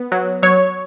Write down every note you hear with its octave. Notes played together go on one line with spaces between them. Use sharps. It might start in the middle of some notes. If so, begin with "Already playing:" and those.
Already playing: B3
F#3
F#3 C#5